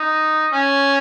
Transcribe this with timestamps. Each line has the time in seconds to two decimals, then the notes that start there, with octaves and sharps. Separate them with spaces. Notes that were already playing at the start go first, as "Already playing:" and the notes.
Already playing: D#4
0.52 C#4